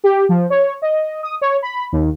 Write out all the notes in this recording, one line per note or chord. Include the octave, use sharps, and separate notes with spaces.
G4
F3
C#5
D#5
D#6
C#5
B5
D#2